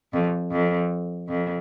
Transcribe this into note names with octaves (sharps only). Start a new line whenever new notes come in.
F2
F2
F2